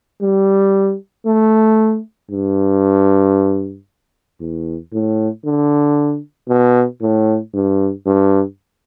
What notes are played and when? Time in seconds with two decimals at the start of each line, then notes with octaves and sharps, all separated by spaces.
0.22 G3
1.26 A3
2.31 G2
4.40 E2
4.92 A2
5.45 D3
6.49 B2
7.02 A2
7.54 G2
8.06 G2